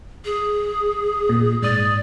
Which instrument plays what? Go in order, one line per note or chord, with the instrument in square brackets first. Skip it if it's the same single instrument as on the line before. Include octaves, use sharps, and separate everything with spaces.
[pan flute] G#4
[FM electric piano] A#2
[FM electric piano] G#2 D#6 [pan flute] D5